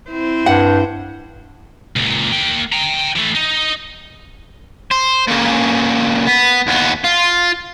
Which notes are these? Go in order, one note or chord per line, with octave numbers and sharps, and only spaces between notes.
C4 E4 C5
G2 F#5
C#2 A#2
A#3 G5
G5 A#5
E3 A3
D#4
C5
A#2 C#3
B3
D#2 B3
F4